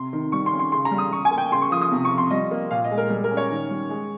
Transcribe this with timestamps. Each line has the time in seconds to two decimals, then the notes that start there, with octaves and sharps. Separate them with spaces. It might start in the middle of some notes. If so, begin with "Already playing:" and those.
Already playing: C3 C6
0.13 D#3
0.32 G3 C#6
0.46 C6
0.53 C#4
0.59 C6
0.72 C#3 C6
0.85 A#5
0.91 G3
0.98 D#6
1.11 G3 C#6
1.25 G#5
1.31 A#3
1.38 G5
1.52 C#3 C6
1.62 C#6
1.71 F3 D#6
1.82 D#6
1.92 C3
2.05 C#6
2.11 F3
2.18 C6
2.30 G3 D#5
2.51 A#3
2.71 A#2 F5
2.84 D#5
2.91 G#3
2.98 A#4
3.10 G3
3.24 A#4
3.31 C#4
3.37 C#5
3.50 D#3
3.70 G3
3.90 G#3